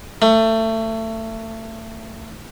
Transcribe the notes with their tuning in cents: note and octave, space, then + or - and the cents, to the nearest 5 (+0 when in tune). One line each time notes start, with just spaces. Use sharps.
A3 +25